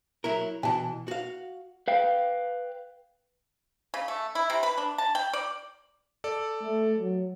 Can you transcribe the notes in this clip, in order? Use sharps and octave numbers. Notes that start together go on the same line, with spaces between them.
F#3 E4 A#4
B2 E3 G#5 A5
F#4 F5
B4 F5 G5
C#3
A3
E4
C3
B4
D4
A5
G5
D5
A4 D5
A3
F#3